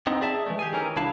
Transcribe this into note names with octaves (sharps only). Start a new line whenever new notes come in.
B3 C4 D#4
G#4 D5 E5 A5
E3 G#3 A3
G4 G#4 G#5
D#3 E3 C#4 A#4
C2 D4 E4 F5 A5